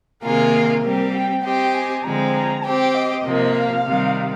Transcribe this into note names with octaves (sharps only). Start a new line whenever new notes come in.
C3 D#3 A#3 F4 G#4 A#4
G3 C4 G4
G5
C4 G4 C5 D#5 G5
G#5
D3 F3 G#3 C4 A#5
A#5
C4 G4 C5 G5
D#5
C3 F3 A#3
F5
C3 D#3 G3